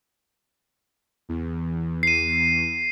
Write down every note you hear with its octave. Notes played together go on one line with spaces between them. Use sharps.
E2
C7 D#7